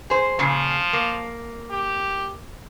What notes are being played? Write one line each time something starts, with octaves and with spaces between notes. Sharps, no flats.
G#4 C5
A#2 C#3 F3
A#3
G4